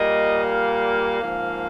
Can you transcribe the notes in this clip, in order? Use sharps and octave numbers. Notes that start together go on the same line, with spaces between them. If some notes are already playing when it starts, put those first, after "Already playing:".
Already playing: A#2 G3 A#3 D#5
F5
G#2 F3 A#3